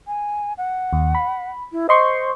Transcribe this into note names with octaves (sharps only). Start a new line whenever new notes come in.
G#5
F#5
D#2
B5
E4
C5 D#5 C6 C#6